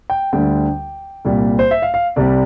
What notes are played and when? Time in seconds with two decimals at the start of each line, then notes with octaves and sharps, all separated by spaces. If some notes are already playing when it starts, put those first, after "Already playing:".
0.10 G5
0.32 D2 D3 G3 G5
1.25 C2 A#2 G3
1.59 C5
1.71 E5
1.82 F5
1.94 F5
2.16 C2 C3 G3 D5